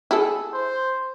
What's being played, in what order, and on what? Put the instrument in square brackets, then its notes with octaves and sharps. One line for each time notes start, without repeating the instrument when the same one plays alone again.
[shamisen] E4 G#4 A4
[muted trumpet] C5